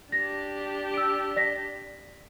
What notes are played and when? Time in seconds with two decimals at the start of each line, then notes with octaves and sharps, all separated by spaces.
0.12 D4 G4 A#6
0.94 E6 D7
1.36 D5 A#6 B6